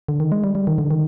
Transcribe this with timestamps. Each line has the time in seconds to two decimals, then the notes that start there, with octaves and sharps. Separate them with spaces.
0.08 D3
0.20 D#3
0.32 G#3
0.44 G3
0.55 G3
0.67 D#3
0.78 D3
0.91 D#3